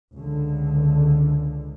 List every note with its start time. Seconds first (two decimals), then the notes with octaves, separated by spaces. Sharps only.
0.14 C#2 D3